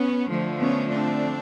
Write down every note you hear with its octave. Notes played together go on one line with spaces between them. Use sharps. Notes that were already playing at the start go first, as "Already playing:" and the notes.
Already playing: B3 C#4
D3 F3 A3
B3 C#4
C4 D4